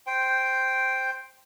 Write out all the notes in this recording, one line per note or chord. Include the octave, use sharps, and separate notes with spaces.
C5 G5